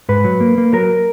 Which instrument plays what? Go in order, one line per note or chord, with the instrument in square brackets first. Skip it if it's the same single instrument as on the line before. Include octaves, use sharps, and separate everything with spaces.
[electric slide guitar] G#2 B4
F#3
A#3
A#3
F#3 A#4